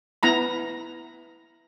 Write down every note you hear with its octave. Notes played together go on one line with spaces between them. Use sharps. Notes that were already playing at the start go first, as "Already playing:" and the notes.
B3 E4 A#5 B5